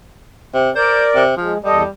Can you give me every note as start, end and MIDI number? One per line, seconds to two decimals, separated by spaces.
0.54 0.70 48
0.75 1.23 70
0.75 1.05 72
0.75 1.23 74
1.15 1.34 48
1.37 1.54 53
1.37 1.58 56
1.64 1.83 40
1.64 1.88 55
1.64 1.83 69
1.64 1.83 75